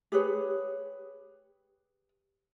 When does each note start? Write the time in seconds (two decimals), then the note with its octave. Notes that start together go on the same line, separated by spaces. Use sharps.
0.12 G4 G#4 B4 C#5